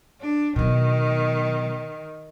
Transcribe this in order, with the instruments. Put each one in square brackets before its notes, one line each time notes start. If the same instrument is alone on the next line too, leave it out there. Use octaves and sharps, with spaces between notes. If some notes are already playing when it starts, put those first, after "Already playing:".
[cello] D4
[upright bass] B2 F#3 [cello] D#3